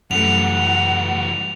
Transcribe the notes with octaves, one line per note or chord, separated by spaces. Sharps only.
F#2 E3 G3 A3 F#5 F7